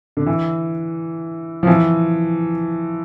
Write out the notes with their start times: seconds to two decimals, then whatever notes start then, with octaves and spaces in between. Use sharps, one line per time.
0.17 D3
0.26 E3
1.63 F3
1.67 E3